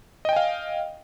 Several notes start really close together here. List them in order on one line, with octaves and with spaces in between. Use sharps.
D#5 G5 G#5 F5